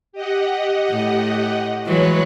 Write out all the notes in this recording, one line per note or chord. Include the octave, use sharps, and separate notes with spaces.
G4 D#5 F#5
A2
E3 F#3 G#3 B4 C#5 F#6